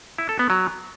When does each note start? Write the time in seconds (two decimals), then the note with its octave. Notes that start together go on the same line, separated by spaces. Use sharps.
0.18 E4
0.29 A4
0.39 B3
0.50 F#3